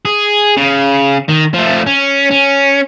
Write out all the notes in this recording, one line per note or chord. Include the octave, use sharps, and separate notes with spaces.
G#4
C#3
D#3
F3 A3
C#4
C#4